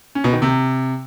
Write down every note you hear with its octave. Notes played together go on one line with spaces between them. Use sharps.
C#4
B2
D#3
C3